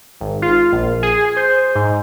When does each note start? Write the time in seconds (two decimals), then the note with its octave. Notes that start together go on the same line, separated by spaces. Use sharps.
0.21 G#1
0.42 F4
0.72 A#1
1.03 G#4
1.36 C5
1.75 G#2